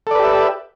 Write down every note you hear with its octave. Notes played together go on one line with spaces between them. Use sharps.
G4 A4 B4 D5 E5